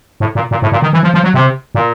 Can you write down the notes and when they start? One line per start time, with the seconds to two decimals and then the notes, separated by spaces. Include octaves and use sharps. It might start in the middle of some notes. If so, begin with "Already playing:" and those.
0.20 A2
0.35 A#2
0.51 A#2
0.62 A2
0.72 A#2
0.82 D#3
0.93 E3
1.03 F3
1.14 F3
1.24 F#3
1.34 C3
1.75 A#2